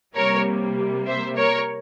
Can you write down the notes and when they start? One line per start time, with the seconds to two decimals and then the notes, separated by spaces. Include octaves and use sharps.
0.16 C3 G3 A#3 A#4 C#5
1.06 C5 E5
1.36 A#4 C#5